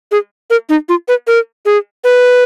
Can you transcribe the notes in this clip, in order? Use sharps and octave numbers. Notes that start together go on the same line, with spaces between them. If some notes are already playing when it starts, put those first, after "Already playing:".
G#4
A#4
D#4
F4
B4
A#4
G#4
B4